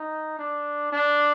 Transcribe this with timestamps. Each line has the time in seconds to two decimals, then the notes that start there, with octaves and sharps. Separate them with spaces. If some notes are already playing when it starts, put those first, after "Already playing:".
Already playing: D#4
0.39 D4
0.92 D4